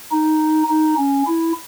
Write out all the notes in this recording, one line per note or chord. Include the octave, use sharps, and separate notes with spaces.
D#4
D#4
C#4
E4